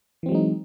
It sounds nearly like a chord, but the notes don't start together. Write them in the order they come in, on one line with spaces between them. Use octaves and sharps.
E3 C4 F#3 G#3 D#4